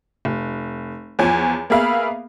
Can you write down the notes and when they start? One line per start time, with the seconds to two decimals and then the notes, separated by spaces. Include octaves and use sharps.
0.25 F1
1.19 E2 F3 C#5 G#5
1.70 A#3 B3 G#4 E5 F5 B5